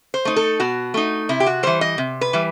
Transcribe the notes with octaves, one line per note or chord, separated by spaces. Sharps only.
C5
A3 D#4
A4
B2 F#4
A3 D#4
C3 E4
G4
F#4
E3 G3 C5
D#5
C3
B4
E3 G3